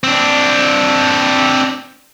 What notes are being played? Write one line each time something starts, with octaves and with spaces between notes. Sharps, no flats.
C4 D4